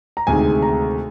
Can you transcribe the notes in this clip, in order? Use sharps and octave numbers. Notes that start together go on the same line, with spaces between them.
A#5
D2 C3 D#3 G#3 G#5
A#5